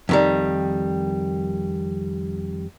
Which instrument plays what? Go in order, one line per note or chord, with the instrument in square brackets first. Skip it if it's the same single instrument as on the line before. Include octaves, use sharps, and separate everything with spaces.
[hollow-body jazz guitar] F2 D#3 G3